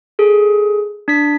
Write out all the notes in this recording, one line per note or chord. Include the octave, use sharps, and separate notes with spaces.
G#4 A4
D4 B6